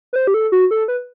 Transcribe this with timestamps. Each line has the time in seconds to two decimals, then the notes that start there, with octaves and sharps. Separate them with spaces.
0.13 B4
0.16 C5
0.27 G4
0.34 A4
0.52 F#4
0.71 A4
0.88 B4